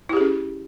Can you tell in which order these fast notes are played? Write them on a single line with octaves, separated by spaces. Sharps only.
E4 G4 G#4 C#4